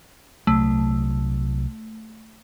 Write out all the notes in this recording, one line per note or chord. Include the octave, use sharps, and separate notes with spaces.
C2 F#3 A3